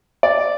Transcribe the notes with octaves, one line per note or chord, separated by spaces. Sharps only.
D5